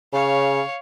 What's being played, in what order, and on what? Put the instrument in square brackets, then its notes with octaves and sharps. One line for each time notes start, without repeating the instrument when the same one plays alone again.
[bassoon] C#3 [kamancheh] C#5 F5